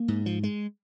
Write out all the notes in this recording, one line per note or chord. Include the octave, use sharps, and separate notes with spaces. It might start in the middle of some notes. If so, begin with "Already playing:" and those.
Already playing: A#3
G#2
F3
G#3